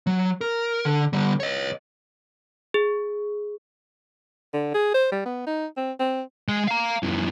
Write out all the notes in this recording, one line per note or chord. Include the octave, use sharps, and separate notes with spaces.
F#3
A#4
D3
D3 G3
C#5 D#5
G#4
D3
G#4
C5
G3
B3
D#4
C4
C4
G#3 G#4
F5 A#5
F#2 E3